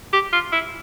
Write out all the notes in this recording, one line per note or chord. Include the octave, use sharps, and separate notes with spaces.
G4
F4
E4